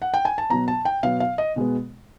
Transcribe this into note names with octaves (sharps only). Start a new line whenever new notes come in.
F#5
G5
G#5
A5
B2 F#3 B3 A#5
A5
G5
B2 F#3 B3 F5
F5
D#5
B2 G#3 B3